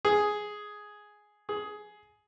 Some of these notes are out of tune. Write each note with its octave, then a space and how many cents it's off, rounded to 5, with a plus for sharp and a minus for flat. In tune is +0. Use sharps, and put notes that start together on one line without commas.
G#4 +5
G#4 +15